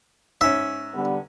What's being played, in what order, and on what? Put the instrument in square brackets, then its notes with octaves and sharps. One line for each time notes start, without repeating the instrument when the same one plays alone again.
[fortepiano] G#2 C#4 [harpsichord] E5
[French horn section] D3 G3 B3